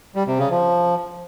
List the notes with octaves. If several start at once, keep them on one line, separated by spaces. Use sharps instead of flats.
G3
C3
C#3
F3